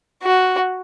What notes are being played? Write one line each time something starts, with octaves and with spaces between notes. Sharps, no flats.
F#4